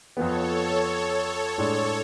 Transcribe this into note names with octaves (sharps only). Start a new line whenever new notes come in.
F2 F3 B3 A4 C#5
A2 G#3 D4 A4 C#5